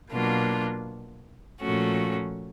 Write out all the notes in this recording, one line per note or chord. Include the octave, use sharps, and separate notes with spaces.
B2 F#3 A#3 D4 F4
A#2 F3 A3 C#4 F#4